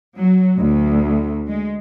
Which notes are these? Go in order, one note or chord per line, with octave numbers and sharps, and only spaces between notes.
F#3
D2
G#3